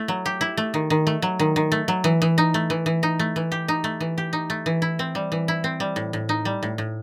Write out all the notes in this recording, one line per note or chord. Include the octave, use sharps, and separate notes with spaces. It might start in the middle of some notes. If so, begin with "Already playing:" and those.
Already playing: A3 E4
F#3
G4
E4
A3
D#3
D#3
A3
F#3
D#3
D#3
A3
F#3
E3
E3
D#4
A3
E3
E3
D#4
A3
E3
G4
D#4
A3
E3
G4
D#4
A3
E3
E4
C4
G3
E3
E4
C4
G3
A2
A2
D#4
G3
A2
A2